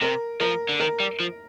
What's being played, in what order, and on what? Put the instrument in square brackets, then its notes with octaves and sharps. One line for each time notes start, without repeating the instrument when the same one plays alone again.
[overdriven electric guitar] C3 [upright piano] A#4
[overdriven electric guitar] F3 [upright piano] A#4
[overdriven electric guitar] D3
[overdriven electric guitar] D#3 [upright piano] A#4
[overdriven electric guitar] G3
F3